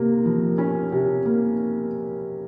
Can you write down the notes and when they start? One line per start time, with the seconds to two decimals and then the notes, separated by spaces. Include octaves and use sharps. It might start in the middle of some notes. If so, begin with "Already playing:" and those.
Already playing: C3 A#3
0.25 F3
0.58 C#4
0.92 C3
1.25 A#3